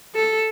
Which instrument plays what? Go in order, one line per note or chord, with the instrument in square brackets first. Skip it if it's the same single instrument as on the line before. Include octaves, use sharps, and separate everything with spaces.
[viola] A4